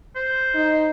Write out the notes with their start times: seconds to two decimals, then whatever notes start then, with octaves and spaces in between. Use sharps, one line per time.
0.15 C5
0.55 D#4